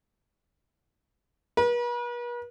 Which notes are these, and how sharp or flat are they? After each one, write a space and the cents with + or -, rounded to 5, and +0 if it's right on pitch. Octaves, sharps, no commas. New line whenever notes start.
B4 -45